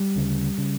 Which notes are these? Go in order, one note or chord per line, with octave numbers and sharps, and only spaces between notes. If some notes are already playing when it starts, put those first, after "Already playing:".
Already playing: G3
D2 C#3
C#3